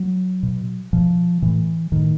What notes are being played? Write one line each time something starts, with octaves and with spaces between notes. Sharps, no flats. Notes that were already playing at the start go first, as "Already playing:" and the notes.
Already playing: F#3
B2
B2 F3
A2 E3
A2 D#3